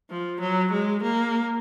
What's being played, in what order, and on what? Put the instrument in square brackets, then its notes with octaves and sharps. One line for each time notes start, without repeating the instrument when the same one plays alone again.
[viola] F3
F#3
G#3
A#3